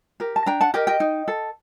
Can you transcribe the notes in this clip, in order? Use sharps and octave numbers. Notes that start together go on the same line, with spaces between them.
G4 A#4
A5
D4 G5 A#5
F#5 A5
G4 A#4 D#5 G5
D#5 G5
D#4
A4